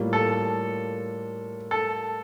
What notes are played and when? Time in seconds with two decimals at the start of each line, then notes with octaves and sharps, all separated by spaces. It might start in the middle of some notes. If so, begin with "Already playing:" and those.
Already playing: A2 G3 A#3 F4
0.13 A4
1.71 A4